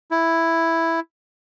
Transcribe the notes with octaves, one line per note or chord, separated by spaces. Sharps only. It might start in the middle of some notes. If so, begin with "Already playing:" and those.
E4